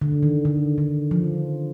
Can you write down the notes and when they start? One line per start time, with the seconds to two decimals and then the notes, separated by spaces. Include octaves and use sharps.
0.02 D3
0.23 D#3
0.45 D3
0.78 D3
1.11 F3